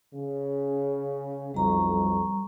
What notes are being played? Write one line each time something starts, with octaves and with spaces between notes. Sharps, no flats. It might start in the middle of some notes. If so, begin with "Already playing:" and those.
C#3
B1 F2 G3 A#5 C#6